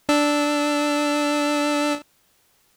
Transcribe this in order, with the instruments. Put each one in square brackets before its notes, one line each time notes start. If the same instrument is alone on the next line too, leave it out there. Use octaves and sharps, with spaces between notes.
[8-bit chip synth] D4 E6